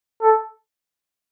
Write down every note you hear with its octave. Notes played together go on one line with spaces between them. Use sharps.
A4